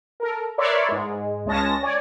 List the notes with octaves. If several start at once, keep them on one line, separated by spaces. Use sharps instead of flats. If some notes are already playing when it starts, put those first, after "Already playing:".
A4 A#4
A#4 B4 C#5 D5 E5 C6
G#2 G#3
C#2 G#3 C#4 A5 A#6
C#5 D5 G#5